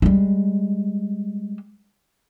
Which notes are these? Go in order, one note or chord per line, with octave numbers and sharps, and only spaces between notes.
G3 G#3